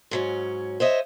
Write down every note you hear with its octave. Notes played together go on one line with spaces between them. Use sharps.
G#2 F#3 C#4
C5 C#5 D#5 E5